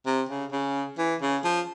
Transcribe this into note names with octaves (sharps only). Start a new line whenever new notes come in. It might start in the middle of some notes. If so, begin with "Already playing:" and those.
C3
C#3
C#3
E3
C#3
F3